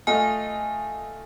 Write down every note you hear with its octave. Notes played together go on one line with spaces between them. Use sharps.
A3 F4 D#5 G#5